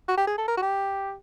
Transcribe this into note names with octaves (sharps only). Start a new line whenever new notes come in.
F#4
G4
G#4
A4
A#4
F#4
G4